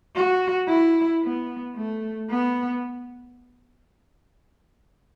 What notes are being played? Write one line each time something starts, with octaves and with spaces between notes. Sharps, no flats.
F#4
E4
B3
A3
B3